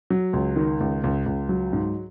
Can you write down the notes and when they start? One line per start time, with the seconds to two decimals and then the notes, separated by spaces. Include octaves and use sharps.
0.10 F#3
0.33 C#2
0.56 D#3
0.80 C#2
1.04 C#2
1.26 C#2
1.49 F#3
1.73 G#2